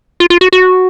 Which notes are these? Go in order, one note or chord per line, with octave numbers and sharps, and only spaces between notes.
F4
F4
F#4
F#4